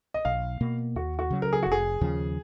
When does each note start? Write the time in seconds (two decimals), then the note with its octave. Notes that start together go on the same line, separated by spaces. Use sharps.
0.14 D#5
0.25 B1 F5
0.61 B2 A#3
0.96 D#2 F#4
1.19 F#4
1.30 C#3 F#3
1.42 A#4
1.53 G#4
1.63 F1 F#4
1.72 G#4
2.01 D#2 C#3 F3